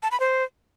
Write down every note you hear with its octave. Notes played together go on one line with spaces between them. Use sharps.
A5
B5
C5